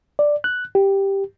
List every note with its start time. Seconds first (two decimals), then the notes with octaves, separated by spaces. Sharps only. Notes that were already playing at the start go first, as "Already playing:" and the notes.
0.19 D5
0.44 F#6
0.75 G4